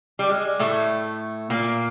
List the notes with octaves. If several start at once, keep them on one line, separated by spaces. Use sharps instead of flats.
G3
G#3
A2 A3
A#2 A#3